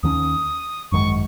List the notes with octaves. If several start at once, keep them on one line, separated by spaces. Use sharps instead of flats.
D#2 D#3 A#3 C#4 D#6
G#1 F#2 D#3 G#3 C#6